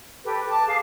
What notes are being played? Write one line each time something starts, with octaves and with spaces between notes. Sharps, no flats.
G4 A4 B4
A5 D6
G#4 F5 D6